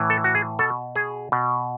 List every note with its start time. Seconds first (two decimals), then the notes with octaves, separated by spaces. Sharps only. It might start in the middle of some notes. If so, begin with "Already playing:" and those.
Already playing: A2 E3
0.10 A4
0.24 F#4
0.35 G#4
0.59 B2 A4
0.96 G#4
1.32 B2